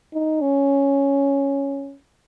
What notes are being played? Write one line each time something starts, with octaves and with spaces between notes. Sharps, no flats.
D#4
C#4